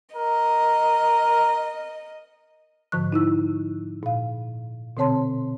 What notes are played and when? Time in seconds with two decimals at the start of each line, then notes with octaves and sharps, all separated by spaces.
0.16 A#4 D#5
2.92 G#2 D3 F3 C#6 F#6
3.12 D#4 E4 E6
4.03 A#2 F5
4.97 B2 D3 C4 C#5 A5 C6